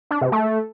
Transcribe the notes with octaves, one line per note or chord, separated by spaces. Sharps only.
D4
C3
A3